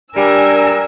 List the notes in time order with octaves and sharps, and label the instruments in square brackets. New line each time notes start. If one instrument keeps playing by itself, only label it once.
[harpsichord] G3 [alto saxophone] D4 [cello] A#4 [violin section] G#5 E6